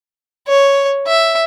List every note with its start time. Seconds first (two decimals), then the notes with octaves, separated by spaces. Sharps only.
0.48 C#5
1.07 E5